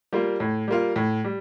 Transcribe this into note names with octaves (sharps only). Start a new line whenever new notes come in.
G3 A#3 F4
A2
G3 A#3 F4
A2
G3